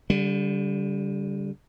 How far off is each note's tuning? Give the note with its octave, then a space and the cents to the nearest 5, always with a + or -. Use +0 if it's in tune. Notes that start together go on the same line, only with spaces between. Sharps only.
D3 -35 G3 +0